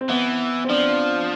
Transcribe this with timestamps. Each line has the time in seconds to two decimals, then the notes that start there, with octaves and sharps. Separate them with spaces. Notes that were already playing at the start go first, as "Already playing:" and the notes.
0.01 C4
0.09 E3 B3
0.64 C4
0.69 F3 D4